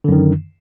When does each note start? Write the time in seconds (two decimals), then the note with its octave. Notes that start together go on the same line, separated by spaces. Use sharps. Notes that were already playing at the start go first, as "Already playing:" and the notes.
0.04 D3
0.08 F#2
0.12 D#3